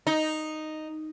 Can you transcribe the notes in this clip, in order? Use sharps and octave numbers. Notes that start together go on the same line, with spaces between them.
D#4